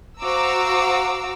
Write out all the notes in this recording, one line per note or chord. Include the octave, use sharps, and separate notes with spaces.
F#4 C5 F5 A#5 D6 E6